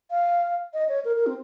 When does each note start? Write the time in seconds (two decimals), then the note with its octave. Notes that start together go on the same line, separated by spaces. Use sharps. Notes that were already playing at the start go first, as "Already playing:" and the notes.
0.11 F5
0.74 D#5
0.89 C#5
1.05 A#4
1.16 A#4
1.26 C4